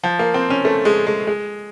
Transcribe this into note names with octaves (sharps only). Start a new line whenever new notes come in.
F3
A#3
C4
C#4
A3
G#3
G#3
G#3